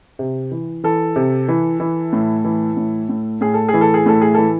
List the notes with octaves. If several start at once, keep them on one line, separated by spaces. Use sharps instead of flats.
C3
E3
E3 A4
C3
E3
E3
A2
E3
A2
A2
A2 G#4
A4
G#4
E3
A4
G#4
A2 A4
G#4
E3 A4